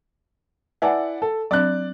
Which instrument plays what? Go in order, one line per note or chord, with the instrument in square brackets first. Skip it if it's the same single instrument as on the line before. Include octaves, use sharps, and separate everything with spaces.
[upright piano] E4 D5 F#5 [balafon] B4 G#5 A5
[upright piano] A4
[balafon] F#3 C4 D4 [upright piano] D5 F#6